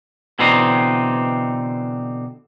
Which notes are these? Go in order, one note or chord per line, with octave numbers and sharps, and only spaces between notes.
B2 D3 E3 C4 D#4